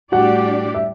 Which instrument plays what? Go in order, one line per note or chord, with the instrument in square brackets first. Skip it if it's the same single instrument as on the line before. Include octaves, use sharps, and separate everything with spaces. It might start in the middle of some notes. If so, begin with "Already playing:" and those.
[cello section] A2 G3 D4 G4 D5 [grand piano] F#4 F#5
[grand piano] E5